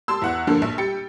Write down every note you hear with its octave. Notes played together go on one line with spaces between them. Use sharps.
G4 A5 C6 E6
E2 F#5 F#6
G2 D3 F3 A#3 A4
A#1
G3 G4 G5 A6 C#7